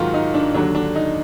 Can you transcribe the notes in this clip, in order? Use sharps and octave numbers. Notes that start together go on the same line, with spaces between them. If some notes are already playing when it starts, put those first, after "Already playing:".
Already playing: G#2 D#3 F#3 F4 F#4
D#4
D4
D#2 D3 F#3 D4
D4
D#4